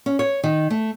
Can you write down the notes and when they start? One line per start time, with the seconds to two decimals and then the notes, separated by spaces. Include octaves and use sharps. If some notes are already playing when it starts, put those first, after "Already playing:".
0.06 C#4
0.19 C#5
0.44 D#3
0.70 A3